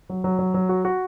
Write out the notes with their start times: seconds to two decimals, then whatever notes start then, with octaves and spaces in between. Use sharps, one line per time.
0.10 F#3
0.24 F#3
0.39 F#3
0.54 F#3
0.69 F#4
0.85 F#4